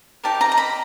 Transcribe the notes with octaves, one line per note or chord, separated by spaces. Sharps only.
D#4 G4 A#4 D5 A5
A#5
A#5
B5